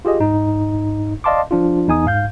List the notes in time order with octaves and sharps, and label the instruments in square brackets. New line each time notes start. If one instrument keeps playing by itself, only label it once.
[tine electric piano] F4 G4 G#4 D#5
G#2 D#4
D5 D#5 F5 A5 C6 D6
F3 D4 F4
E2 D#4 G#5 D#6
G#2 F5 G6